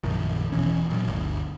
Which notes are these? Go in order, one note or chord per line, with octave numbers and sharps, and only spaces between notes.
A#1 F#2 D#3 F3
E1 B2 E3 C#4
A#2 F#3
G1 D2